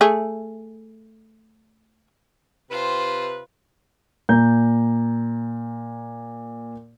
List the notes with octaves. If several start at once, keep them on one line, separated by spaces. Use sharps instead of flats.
A3 G#4
C3 F4 B4 C5
A#2 A#5 G6